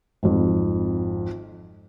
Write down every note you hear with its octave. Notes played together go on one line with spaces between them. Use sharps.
G#1 F2